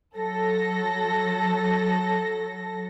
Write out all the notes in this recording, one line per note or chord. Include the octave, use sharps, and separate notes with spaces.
F#3 A4 A#6